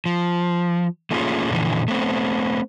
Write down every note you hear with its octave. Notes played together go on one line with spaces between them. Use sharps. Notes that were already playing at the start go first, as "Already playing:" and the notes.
F3
A3 A#3 C#4 F4 G#4
F2 A#2 D3 E3
A3 B3 C4